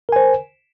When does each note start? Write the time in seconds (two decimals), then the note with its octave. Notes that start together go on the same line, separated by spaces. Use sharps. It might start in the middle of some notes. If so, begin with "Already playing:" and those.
0.09 A#4
0.12 G#5
0.16 C5